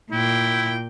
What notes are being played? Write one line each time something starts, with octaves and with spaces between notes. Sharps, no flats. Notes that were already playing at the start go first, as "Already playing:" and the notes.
A#2 E4 G5